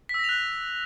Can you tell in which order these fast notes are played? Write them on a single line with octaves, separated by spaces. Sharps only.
B6 E6 A#6 F7 F#6